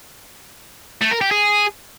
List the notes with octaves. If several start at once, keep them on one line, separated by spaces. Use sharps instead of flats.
A3
A#4
G4
G#4